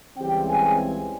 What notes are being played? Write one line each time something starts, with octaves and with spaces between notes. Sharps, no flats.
C#2 C#3 E3 G3 C4 G4 G5
G#4 G#5